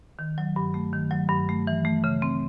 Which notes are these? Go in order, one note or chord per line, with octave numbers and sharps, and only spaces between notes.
D#3
F#3
G2
A3
D#3
F#3
G2
A3
E3
A3
C#3
C4